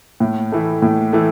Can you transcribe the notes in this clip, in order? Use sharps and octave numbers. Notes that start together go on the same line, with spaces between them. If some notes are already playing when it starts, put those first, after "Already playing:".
A2
E3 A3
A2
E3 A3